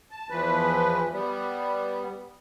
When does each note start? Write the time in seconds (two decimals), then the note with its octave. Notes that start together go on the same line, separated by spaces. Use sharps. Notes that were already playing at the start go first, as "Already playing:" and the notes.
0.11 A5
0.30 E2 E3 F3 B4
1.13 G3 B3